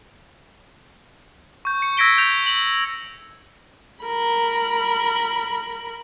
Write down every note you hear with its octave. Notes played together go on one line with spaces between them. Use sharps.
C#6 G6
C#7
E6 G#6 A#6 B6 D7 G7
G6 F7
F#7
A#4 B5